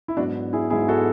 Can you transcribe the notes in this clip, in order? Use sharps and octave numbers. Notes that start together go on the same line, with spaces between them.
E4
G#2 F#3 B3 D4 F#4
E4 G#4
G#2 F#3 B3 E4 G#4
F#4 A4